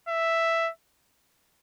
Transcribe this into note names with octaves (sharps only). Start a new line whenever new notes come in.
E5